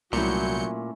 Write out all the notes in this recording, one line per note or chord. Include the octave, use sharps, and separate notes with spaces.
C2 A#2 F#3 A3 C#4 E4 G6 C#7